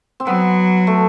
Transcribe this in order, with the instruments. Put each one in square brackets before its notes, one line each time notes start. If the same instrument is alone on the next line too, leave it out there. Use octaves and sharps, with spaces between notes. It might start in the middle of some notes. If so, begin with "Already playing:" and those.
[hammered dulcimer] C4
[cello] F#3 [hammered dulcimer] B3
[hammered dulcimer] A3